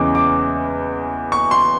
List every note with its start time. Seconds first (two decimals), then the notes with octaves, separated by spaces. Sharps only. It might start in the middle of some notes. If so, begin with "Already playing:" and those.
Already playing: E2 C#3 E3 G#3 C#4 D6
0.15 D6
1.32 C#6
1.51 C6